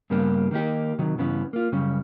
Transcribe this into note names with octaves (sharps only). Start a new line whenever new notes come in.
G2 C#3 G3 A#3 B3
D#3 A#3 D#4 G4
C3 D#3 F#3
G2 C#3 E3 B3 C#4
A#3 F4
F#2 C#3 G3 C#4